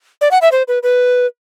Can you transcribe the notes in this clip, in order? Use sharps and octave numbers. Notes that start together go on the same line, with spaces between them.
D5
F#5
E5
C5
B4
B4